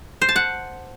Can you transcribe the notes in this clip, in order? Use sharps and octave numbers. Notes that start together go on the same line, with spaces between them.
C5
A5
F#5